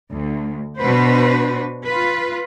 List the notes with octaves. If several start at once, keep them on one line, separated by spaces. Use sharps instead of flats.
D2
B2 D4 F#4 B4 C5
F4 B4